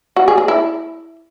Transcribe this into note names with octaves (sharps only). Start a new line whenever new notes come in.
F#4
G#4
G#4
E4